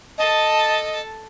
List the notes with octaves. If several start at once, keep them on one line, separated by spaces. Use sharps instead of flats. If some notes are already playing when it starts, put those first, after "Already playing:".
A4 D#5 A5